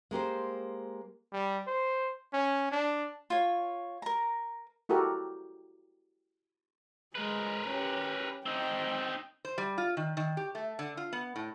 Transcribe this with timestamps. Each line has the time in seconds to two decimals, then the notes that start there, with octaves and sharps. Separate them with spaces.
0.11 G#3 A#3 G4 C5
1.32 G3
1.67 C5
2.33 C#4
2.71 D4
3.30 F4 C#5
4.02 A#4 A#5
4.89 E4 F#4 G4 A4 A#4
7.15 G#3 A#4 B4
7.68 C#4 G4
8.46 C4 D#4 G5
9.45 C5
9.58 G3
9.78 F4
9.97 D#3
10.17 D#3
10.37 G4
10.55 A3
10.79 D3
10.97 F4
11.13 B3
11.36 A2